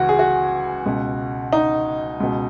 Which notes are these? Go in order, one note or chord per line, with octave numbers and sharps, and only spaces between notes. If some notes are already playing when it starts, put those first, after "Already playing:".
Already playing: C#2 C#3 E3 F#4
G#4
F#4
C#2 B2
D#4
C#2 B2